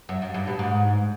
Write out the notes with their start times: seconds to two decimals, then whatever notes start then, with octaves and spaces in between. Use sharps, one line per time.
0.09 F#2
0.22 F#2
0.34 G2
0.47 B2
0.59 G#2